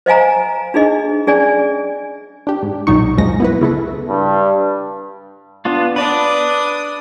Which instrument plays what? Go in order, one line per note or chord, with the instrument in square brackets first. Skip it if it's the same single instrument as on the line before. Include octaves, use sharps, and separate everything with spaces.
[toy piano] C5 D#5 F5 G#5 A#5
D4 D#4 G#4 D#5
C#4 G#4 D5 G#5
[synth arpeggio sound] D4 G4
G#2
B1 A#2 F#3 D#4 C#6
C#2 F#2 F3 G#3 A#6
B3 E4 B4
C#3 E4 A4
[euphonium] G2
[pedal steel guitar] B3 D4 F4
[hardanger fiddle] D4 D#6 [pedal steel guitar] B4 D5